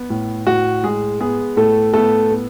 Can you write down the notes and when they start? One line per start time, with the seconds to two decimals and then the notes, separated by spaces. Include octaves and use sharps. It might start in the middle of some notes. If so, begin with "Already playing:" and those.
Already playing: B3
0.10 A2
0.47 A2 F#4
0.83 G#3 G#4
1.20 B3 G#4
1.56 A2 A3 A4
1.94 A3 B3 A4
2.30 B3